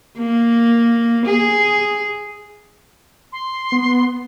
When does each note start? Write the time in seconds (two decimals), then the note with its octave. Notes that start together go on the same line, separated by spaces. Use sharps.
0.18 A#3
1.26 G#4
3.32 C6
3.72 B3